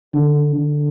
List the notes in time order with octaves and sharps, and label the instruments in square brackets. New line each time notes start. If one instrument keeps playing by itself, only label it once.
[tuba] D3
D3